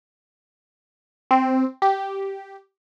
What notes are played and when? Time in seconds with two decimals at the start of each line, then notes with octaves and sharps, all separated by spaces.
1.31 C4
1.82 G4